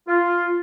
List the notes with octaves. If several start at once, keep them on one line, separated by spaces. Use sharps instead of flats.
F4